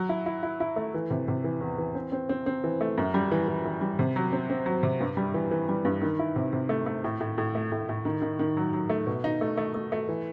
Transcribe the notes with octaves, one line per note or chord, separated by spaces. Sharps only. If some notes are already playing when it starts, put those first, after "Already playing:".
Already playing: F#3
E4
E4
E4
E4
A3
E3
C3
C3
E3
E2
E3
C4
C4
C4
C4
E3
A3
F#2
G3
E3
E3
E3
G3
C3
F#3
C4
C4
F#3
C3
G2
G3
E3
E3
G3
G2
D#3
E4
C3
C3
A3
A3
A2
A2
A2
A3
A2
A2
D#3
D#3
D#3
F#3
F#3
A3
B2
D#4
A3
A3
A3
A3
E3